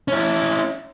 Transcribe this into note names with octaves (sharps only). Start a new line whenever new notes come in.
C#4 E4